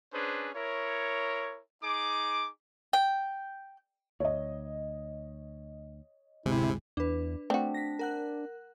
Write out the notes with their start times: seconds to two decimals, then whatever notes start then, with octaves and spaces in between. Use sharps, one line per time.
0.12 C#4 D4 G#4 B4 C5
0.54 E4 A#4 C#5
1.83 D#4 G#4 D6
2.93 G5
4.20 D2 C#5 D#5
6.46 D1 G1 C3 G#3 E4
6.97 E2 D4 B4
7.50 A3 C4 D4 F#4
7.74 A#6 B6
7.99 A#4 F#5 F#6